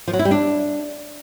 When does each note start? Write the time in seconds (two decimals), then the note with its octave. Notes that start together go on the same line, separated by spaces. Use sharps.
0.08 F3
0.13 F#3
0.19 E4
0.25 G3
0.31 D4